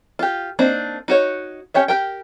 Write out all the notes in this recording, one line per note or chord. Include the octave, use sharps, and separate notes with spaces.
F4 G4
A#3 C4 D4 D#4
D#4 F#4 C#5
C#4 G4 C#5 E5
G4 A#4 G5